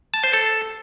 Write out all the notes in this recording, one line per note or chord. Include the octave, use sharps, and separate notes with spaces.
A5
C5
A4